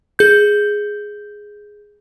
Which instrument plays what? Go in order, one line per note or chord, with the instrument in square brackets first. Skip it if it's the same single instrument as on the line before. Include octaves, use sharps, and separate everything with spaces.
[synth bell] G#4 G6